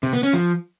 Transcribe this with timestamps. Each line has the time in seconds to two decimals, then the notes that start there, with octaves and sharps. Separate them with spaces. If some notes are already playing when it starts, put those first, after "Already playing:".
0.03 C3
0.13 B3
0.23 C#4
0.33 F3